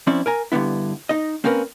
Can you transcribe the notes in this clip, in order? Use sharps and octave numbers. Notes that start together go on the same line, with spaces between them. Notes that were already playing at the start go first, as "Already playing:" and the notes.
F3 C4 C#4 E4 D5
A#4 G#5 A#5
G2 B2 D3 B3 E4
D#4 D#5
A#3 C4 C#4 A#4 B4